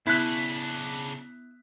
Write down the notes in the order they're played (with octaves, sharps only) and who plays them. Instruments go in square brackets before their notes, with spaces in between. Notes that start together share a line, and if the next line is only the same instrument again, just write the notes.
[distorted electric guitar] C#3 D4 [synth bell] B3 [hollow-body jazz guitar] E4 C5 [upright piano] F#6 B6